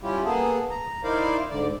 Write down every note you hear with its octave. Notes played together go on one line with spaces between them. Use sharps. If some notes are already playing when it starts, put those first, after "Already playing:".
G3 C#4 E4 F4 G4
A#3 B3 G#4 A4
A#5
D#4 E4 A#4 C5 D5 F5
G#2 D3 D5